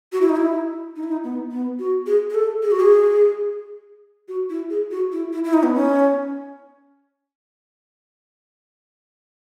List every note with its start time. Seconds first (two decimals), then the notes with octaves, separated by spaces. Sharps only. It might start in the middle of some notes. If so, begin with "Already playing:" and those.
0.12 F#4
0.21 E4
0.29 D#4
0.36 E4
0.96 D#4
1.03 E4
1.12 D#4
1.24 B3
1.51 B3
1.79 F#4
2.06 G#4
2.30 G#4
2.34 A4
2.63 G#4
2.71 F#4
2.80 G#4
4.28 F#4
4.50 E4
4.70 G#4
4.91 F#4
5.12 E4
5.33 E4
5.44 E4
5.53 D#4
5.63 B3
5.74 C#4